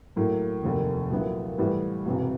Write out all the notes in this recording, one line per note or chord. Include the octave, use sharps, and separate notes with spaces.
A2 F#3 A#3
F1 D#2 D#3
A#2 F#3 B3 E4
A2 E3 G3 B3
E1 E2 C3